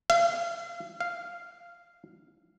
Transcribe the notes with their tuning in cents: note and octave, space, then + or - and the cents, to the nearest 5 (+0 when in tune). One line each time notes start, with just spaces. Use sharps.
F5 -40
F5 -10